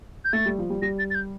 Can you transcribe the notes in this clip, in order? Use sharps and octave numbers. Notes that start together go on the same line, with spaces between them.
G6
A3 A6
G3
F3
G3
G3 A#6
A6
A6
G6